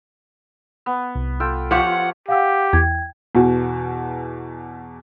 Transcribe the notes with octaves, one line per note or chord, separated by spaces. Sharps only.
B3
C2
F4 A4 G5
F3 F4 G4 C#5 F#5
G4 F5 F#5 E6
E2 G5 G#6
E2 B2 F#4